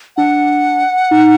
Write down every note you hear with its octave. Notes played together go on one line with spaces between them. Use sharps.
D4 F#5
D#4